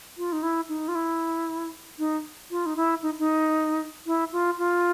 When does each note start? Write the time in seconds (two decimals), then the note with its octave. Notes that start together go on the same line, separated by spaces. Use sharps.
0.18 F4
0.32 D#4
0.43 E4
0.69 D#4
0.88 F4
0.95 E4
1.99 D#4
2.51 F4
2.66 D#4
2.77 E4
3.02 D#4
3.19 D#4
4.06 E4
4.32 F4
4.58 F4